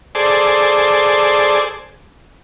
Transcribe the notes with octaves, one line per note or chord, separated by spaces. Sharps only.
G#4 A4 C5 D5